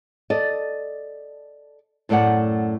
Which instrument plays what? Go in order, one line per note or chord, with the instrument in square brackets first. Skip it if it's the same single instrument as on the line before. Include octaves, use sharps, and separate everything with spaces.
[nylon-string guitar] A4 D5 D#5
F#2 A2 A3 D5 F#5